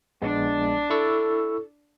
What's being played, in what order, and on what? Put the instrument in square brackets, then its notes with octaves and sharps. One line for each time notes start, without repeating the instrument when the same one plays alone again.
[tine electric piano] A#1 G#3 B3 [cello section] D4
[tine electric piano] E4 C#6 E6 [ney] A4